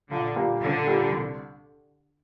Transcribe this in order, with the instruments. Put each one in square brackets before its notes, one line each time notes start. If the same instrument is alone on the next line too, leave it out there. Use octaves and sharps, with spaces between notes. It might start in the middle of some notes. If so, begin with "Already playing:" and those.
[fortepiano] A#1 [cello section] D3
[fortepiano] A#2 G3 A#3
[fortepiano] A#1 [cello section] D3
[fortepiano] A#2 G3 A#3
C2